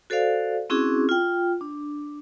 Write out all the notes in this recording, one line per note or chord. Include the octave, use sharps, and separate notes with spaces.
F#4 A4 C5 D5 F5
C4 C#4 E4 F#4 G#4 D6
F4 G5
D4